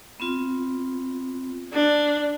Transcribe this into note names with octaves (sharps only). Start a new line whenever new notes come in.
B3 C4 F4
D4